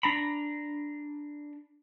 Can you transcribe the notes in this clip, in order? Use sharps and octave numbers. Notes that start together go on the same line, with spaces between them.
D4 A#5 B5